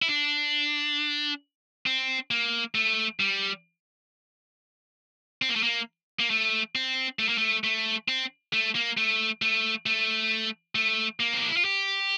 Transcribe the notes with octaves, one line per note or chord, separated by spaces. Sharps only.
E4
D4
C4
A#3
A3
G3
C4
A#3
A3
A#3
A#3
A3
C4
A3
A#3
A3
A3
C4
A3
A#3
A3
A3
A3
A3
A#3
C4
D4
E4
F4
G4